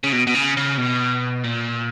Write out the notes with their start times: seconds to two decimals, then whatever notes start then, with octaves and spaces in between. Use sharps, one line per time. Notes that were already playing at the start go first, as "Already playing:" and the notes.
0.04 C#3
0.12 B2
0.27 B2
0.35 C#3
0.57 C#3
0.77 B2
1.44 A#2